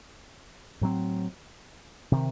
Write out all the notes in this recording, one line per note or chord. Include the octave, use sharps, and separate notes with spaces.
A2 F#3 C4
C3 D#3